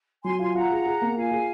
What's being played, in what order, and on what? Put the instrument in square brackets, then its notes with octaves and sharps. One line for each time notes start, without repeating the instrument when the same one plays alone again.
[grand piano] F#3 [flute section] G#5 C6
[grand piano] F4 [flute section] G#5 C6
[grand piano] F4 [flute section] F#5 A#5
[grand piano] G#4
G#4
A#3
[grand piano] F4 [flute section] F5 G#5
[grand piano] G#4